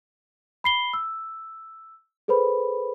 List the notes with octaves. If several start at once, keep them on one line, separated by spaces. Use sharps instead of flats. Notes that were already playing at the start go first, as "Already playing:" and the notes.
B5 C7 G7
E6
G#4 A4 B4 C5 B5